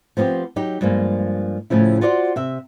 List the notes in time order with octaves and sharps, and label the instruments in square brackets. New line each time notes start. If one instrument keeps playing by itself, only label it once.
[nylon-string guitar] F3 B3 C4 E4 G4
F#3 D#4 G4
G2 F3 G#3 A#3
A2 C#3 F3 E4
F4 F#4 C5 D5 F5 F#5
C3 E5